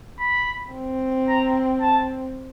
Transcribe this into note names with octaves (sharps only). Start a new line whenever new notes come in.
B5
C4
A#5
A5